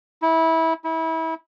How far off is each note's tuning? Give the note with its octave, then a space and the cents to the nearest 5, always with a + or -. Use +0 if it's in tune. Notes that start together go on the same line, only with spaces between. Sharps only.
E4 -20
E4 -30